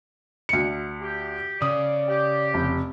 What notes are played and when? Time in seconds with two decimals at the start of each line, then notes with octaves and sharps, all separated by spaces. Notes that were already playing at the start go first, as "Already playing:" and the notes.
0.49 D2 C#7
1.01 G4
1.62 C#3 D5 D#6
2.09 G4
2.54 F1